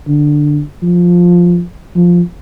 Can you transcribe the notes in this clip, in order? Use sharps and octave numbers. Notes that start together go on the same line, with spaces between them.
D3
F3
F3